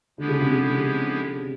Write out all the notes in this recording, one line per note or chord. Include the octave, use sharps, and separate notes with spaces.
D3 F3 G#3 B3 E4 G4
C#3
C3
C#3